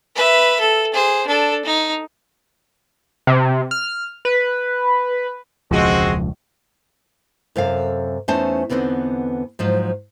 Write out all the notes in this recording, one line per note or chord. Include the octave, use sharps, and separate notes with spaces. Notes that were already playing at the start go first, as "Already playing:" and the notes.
B4 E5
A4
G#4 C5
D4 A4
D#4
C3
F6
B4
E1 C#2 F3 G#3 C4 F#4
F#2 C3 A4 F5
E2 A3 C#4 D#4 C5 A5
E2 D3 B3 C4 D#4
G#2 F3 F#3 D#4